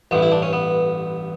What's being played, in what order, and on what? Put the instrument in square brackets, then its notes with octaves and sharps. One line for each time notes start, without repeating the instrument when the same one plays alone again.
[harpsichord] A1 G2 E3 B3
E4
D4
C#4
B3